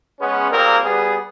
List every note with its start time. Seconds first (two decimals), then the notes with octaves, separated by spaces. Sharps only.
0.20 G#3 B3 C#4
0.51 A#2 G3 A#3 C4 G#4 A#4
0.84 G3 B3 G#4